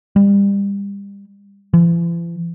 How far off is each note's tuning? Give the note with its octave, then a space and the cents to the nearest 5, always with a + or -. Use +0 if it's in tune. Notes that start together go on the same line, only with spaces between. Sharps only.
G3 +30
E3 +45